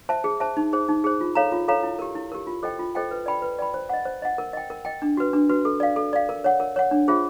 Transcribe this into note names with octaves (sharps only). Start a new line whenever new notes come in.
C5 E5 A5
G#4
C5 E5 A5
D#4
G#4 C5
D#4
G#4 C5
F4
A4 C#5 F5 A#5
F4
A4 C#5 F5 A#5
E4
G4 A#4
E4
G4 A#4
F4
A4 C5 D#5 G5
F4
A4 C5 D#5 G5
B4
D5 G5 B5
B4
D5 G5 B5
C5
D#5 F#5
C5
D#5 F#5
A#4
D#5 G5
A#4
D#5 G5
D4
F#4 B4
D4
F#4 B4
A4
D5 F5
A4
D5 F5
A#4
C#5 F#5
A#4
C#5 F#5
D4
F4 G#4 C5 E5